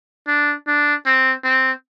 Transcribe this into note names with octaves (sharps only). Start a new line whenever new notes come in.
D4
D4
C4
C4